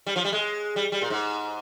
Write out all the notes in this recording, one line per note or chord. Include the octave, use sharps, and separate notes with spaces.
G3
F3
G3
G#3
G3
G3
A#2
G#2